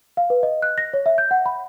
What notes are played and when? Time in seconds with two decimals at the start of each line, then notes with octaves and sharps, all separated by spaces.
0.17 F5
0.30 B4
0.43 D#5
0.62 F#6
0.78 A#6
0.94 C#5
1.06 E5
1.18 G6
1.31 F#5
1.46 B5